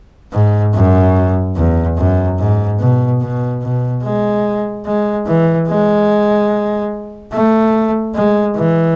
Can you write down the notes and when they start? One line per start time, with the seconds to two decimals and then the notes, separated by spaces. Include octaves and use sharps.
0.33 G#2
0.74 F#2
1.56 E2
1.98 F#2
2.39 G#2
2.80 B2
3.21 B2
3.62 B2
4.03 G#3
4.86 G#3
5.27 E3
5.68 G#3
7.33 A3
8.15 G#3
8.56 E3